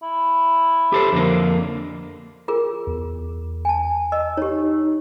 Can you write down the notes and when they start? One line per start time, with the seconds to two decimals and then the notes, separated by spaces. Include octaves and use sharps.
0.02 E4
0.92 G4 A4 C5
1.13 F2 D3 A#3
2.48 F4 G#4 A#4
2.87 E2
3.65 G#5 A5
4.12 D#5 E6
4.37 D#4 G4 C#5